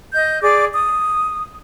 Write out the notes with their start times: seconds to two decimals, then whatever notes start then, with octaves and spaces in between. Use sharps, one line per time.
0.13 D#5 G6
0.41 G#4 D5 D6
0.73 D#6